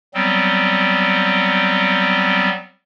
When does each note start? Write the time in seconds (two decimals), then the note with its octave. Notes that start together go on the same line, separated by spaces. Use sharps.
0.14 F#3 G3 B3 C4